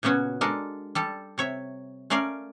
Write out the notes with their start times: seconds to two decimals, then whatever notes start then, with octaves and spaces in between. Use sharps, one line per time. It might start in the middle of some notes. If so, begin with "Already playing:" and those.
0.03 A#2 C#3 B3 C#4 F#4
0.41 G#3 D4 A4 A#4
0.95 G3 A4 A5
1.38 C3 C#5 E5
2.10 A3 C#4 A#4 D5 F5